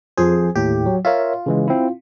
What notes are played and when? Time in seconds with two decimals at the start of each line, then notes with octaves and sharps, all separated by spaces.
0.18 F2 F3 G#4 C5
0.56 D#2 A2 G4
0.86 F#3
1.05 F4 A#4 C#5 E5
1.46 C#3 E3 G#3
1.68 C4 E4